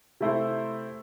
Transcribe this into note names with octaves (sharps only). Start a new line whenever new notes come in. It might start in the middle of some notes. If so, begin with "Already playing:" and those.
C3 A3 E4 C5